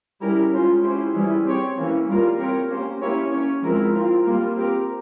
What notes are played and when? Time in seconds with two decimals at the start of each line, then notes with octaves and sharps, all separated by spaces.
0.21 G3 C#4 E4 G4 A#4
0.52 G#3 C#4 F4 C5
0.83 C#4 E4 G4 C5
1.14 E3 G3 C#4 E4 G#4
1.45 C4 G4 C#5
1.76 E3 A#3 C#4
2.07 G3 A#3 F4 A#4
2.38 C4 G4 A#4 C#5
2.69 A#3 C#4 G4 C5
3.01 A#3 C#4 E4 G4 C#5
3.31 C#4 G4 C#5
3.62 F3 G#3 C4 E4 A#4
3.94 C4 F4 A#4
4.24 G3 A#3 F4 A#4
4.56 C4 G4 A#4